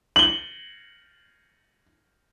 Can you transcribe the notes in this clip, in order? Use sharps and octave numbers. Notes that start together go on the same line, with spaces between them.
F#7 G7